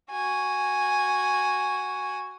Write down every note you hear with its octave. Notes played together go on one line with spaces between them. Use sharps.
F#4 G#5